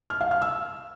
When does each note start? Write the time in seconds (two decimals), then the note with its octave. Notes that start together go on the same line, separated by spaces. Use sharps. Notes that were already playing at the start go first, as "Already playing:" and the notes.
0.10 F6
0.21 F5
0.31 F6
0.42 E6